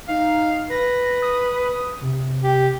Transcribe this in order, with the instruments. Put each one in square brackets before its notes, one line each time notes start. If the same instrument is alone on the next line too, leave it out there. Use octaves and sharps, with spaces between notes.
[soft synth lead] D#4 [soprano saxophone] F5
[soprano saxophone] B4 [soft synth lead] A#6
[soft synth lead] D#6
C3
[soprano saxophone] G4